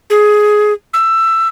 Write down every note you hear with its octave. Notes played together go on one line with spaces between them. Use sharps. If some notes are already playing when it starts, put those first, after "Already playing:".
G#4
E6